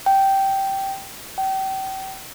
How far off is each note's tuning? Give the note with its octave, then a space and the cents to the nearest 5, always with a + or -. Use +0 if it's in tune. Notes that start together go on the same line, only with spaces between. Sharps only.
G5 -10
G5 -35